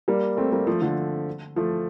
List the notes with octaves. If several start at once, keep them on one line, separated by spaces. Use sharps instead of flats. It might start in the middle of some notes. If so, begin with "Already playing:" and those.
G3 A#3
A3 C4
G3 A#3
F3 A3
D3 F3
F3 A3